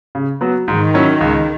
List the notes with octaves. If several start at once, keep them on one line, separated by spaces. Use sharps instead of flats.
C#3
F#3 B3 F#4
G#2 D#3
F#3 C#4 E4
C#2